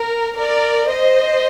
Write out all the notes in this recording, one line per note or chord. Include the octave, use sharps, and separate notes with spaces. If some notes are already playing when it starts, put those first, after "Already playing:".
Already playing: A#4
A#4 D5
C5 D#5